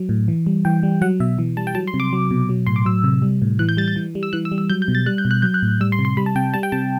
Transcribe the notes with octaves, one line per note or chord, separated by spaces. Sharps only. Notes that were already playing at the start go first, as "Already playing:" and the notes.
Already playing: F#3
A2
E3
G3
E3 G5
G3
F#3 F#5
B2 E5
E3
G3 A5
G5
F#3 A5
C6
C3
D6
F#3
B2
F#3
A2 C6
D6
F#3 E6
C3
G3
A2
E3 F#6
G6
G3 A6
G6
E3
G3
E6
E3 F#6
E6
G3
E6
F#3 G6
G6
B2
A6
G3 F#6
G6
B2
F#6
F#3 G6
F#6
A2
G3 E6
C6
C3
C6
G3 B5
A5
C3 G5
G3 A5
G5
C3 A5